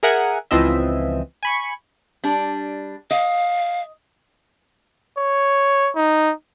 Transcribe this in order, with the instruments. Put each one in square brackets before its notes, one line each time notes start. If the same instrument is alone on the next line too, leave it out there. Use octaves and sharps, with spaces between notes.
[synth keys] G#4 A#4 E5 F#5 G#5
C#2 E3 F3 C4 D#5 E5
G#5 B5 C#6
[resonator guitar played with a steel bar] G3 D4
[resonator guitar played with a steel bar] D#5 [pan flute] F5
[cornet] C#5
D#4